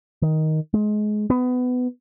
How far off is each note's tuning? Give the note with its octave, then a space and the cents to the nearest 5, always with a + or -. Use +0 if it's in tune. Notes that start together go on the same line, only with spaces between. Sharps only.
D#3 +10
G#3 +25
B3 +20